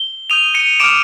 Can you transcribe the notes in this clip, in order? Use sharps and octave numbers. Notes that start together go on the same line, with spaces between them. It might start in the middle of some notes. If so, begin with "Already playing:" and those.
Already playing: G7
D#6 G6 D#7 F7
C#7 D#7
D6 F6 D7 E7